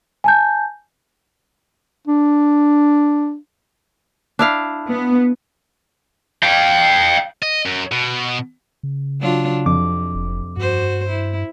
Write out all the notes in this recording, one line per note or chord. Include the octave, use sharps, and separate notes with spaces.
G#5 A5 G6
D4
D4 E4 F5
B3
F5 G5
D#5
F#2
B2
C#3
F#3 D4 F4
F2 C3 D6
F1
G2 F#4 C5
E4